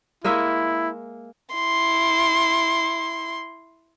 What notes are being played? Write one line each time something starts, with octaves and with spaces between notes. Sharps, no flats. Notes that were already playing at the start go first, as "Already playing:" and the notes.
G#3 A#3 E4 E5
E4 C6